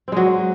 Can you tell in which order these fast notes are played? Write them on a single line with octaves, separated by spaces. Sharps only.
C4 G#3 F#3